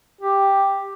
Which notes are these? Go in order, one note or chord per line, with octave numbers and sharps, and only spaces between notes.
G4